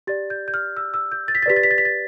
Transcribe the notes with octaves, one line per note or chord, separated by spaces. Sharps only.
G4 D5 A6
G6
G6
F6
E6
E6
G6
A6
B6
A6
G4 B4 D5 B6
A6
B6
A6
B6
A6